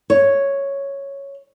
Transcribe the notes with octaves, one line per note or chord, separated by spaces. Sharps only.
C#5